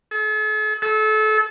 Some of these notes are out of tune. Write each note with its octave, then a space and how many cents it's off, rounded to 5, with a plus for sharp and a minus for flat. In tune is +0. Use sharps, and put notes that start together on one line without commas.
A4 -45
A4 -30